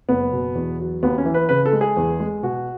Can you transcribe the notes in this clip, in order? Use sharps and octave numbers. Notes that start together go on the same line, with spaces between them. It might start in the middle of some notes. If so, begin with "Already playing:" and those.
F#1 B3
B2
E2
F#3
D#2 B3
C#4
E3
B4
C#3 B4
A4
G#3
G#4
E2
G#3
B2 F#4